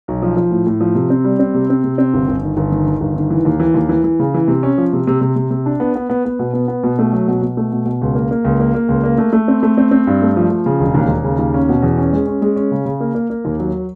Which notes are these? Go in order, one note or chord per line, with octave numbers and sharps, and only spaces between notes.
B1
F3
F3
A2
A2
F3
C3
C4
G3
C4
C3
C4
C3
C4
G1
G1
D#3
G1
D#3
D#3
G1
D#3
E3
D#2
E3
D#2
E3
E3
C#3
E3
C3
C#4
F3
C3
C3
C3
C3
C3
D4
B3
B3
B3
B3
B2
B3
B3
B2
A3
F#3
B2
B2
A3
B2
B2
C#2
A#3
A#3
C#2
A#3
A#3
C#2
A#3
A3
A3
C4
A3
C4
C4
G2
A3
F3
F3
C#3
E1
D#2
D#2
C#3
D#2
C#4
B2
E2
C#4
G#3
C#4
G#3
C#4
C#3
C#3
A#3
A#3
A#3
D#2
F#3